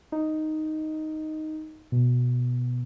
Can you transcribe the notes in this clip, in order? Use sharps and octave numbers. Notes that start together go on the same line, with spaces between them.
D#4
B2